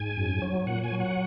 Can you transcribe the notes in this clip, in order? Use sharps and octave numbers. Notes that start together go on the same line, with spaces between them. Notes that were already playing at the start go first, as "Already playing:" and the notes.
Already playing: G#2 G#5
F#2
F#3
A#2 F#5
G#5
F#3
F#5